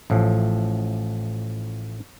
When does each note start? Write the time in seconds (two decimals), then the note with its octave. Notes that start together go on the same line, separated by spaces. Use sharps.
0.10 A1 A2 F3